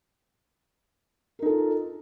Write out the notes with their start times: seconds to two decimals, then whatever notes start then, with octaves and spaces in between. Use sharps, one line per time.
1.39 A#4
1.42 D#4
1.46 A4
1.49 F4